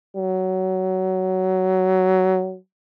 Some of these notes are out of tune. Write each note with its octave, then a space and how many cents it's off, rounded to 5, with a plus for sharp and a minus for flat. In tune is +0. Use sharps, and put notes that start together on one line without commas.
F#3 +15